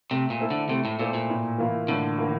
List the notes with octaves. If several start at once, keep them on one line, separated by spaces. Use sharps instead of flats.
C3 A3
A#2
E4 A4 C5
D3
C3 A3
A2
A#2 E4 A4 C5
A#2
A2
E3 A#3 F4
A2 D3
E3 A#3 F4